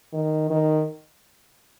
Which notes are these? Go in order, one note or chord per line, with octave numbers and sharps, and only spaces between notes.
D#3
D#3